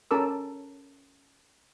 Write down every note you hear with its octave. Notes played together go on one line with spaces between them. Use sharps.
C#4 A4 A#4 A5 D6 E6